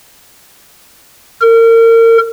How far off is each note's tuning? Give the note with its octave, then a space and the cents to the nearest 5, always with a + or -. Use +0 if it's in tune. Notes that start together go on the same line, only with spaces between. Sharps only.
A#4 -35